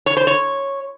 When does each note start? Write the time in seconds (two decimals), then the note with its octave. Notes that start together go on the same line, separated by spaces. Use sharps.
0.06 C#5
0.17 C5
0.27 C#5